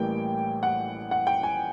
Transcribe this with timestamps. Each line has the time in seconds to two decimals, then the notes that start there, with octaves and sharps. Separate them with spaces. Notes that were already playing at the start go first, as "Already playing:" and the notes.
Already playing: A1 A2 E3 G3 A#3 G5
0.63 F#5
1.11 F#5
1.27 G5
1.43 G#5